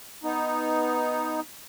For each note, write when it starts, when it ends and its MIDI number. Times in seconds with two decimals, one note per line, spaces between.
0.24 1.40 59
0.24 1.40 63